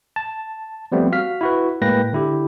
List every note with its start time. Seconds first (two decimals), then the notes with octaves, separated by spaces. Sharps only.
0.16 A5
0.92 F3 G3 A3 B3 C4
1.12 F#4 F5 F6 B6
1.41 E4 F#4 B4
1.82 A2 G#3 A#3 B4 G5 A#6
2.13 D3 E4 G4